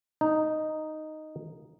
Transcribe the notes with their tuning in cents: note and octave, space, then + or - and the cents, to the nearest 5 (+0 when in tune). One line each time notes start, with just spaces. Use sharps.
D#4 -5